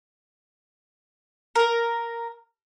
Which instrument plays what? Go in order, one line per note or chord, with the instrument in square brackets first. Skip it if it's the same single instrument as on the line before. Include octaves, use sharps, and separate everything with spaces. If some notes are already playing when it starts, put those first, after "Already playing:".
[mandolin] A#4